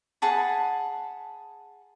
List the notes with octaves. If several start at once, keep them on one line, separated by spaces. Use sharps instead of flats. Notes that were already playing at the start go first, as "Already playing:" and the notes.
G#4 F#5 A5 B5